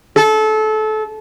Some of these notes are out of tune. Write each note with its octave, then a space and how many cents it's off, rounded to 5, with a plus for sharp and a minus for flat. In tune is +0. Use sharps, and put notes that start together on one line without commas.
A4 -25